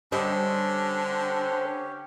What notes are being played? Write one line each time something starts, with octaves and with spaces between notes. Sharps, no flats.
D3 G3 C#4 D4 G4 C5 C#5 D#5